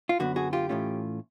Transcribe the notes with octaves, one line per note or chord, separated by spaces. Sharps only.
F4
F#2 D3 F#3 B3 F#4
F#4 G#4
F4 G4
A2 E3 A3 C#4 F4